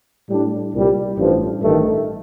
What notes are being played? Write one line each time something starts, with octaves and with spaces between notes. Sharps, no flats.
A2 G3 D4
C2 A#2 G3
A1 G2 F3
A1 G2 D#3 A3